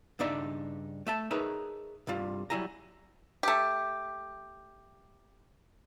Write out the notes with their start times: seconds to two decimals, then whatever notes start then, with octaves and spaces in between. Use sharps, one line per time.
0.19 G2 C#3 D4 D#4 D5 E5
1.07 A3 E5 A5
1.31 D#4 G#4 A#4 B4 C#5 E5
2.07 C2 G2 G3 F4
2.50 F#3 G3 E4 G#5 A#5
3.43 A3 G4